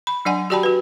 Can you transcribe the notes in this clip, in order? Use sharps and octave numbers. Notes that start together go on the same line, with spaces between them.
B5
F#3 D4 D5 F#5 G#5
F#4 G4 D5 G5 A5 B5
F#4 B4